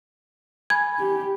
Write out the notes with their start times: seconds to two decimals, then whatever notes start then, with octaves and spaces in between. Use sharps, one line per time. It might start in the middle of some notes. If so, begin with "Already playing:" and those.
0.70 G#5 B5 G#6
0.99 G4